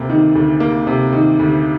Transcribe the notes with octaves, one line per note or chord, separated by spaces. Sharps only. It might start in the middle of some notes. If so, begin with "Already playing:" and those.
Already playing: D2 C3 A#3
D#3
D2
A#3
C3
D#3
D2